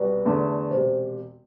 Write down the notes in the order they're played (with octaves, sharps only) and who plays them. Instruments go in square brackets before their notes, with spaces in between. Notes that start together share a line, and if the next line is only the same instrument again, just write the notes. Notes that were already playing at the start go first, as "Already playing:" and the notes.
Already playing: [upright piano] C2 B2 B3 F#4 [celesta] B4 D5
[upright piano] E2 D3 A3
[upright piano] E1 C3 [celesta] C5